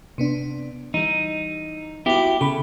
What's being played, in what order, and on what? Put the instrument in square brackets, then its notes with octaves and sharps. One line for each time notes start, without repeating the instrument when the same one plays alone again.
[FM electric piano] C3 B3 D4
[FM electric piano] E3 G3 [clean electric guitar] D#4
[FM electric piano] B3 F#4 [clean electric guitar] E4 G4
[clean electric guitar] C#3 [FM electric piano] A4 B5